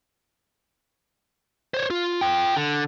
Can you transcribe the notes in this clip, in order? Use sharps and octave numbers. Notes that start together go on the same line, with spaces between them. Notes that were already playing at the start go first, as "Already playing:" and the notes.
C5 C#5
F4
F4 G5
D3